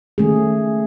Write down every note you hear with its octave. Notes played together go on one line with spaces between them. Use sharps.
D#3 A3 C#4 G#4